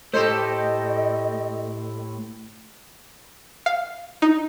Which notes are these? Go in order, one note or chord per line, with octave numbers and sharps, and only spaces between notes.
A2 A3 G4 A4 C5 D#5
F5
D#4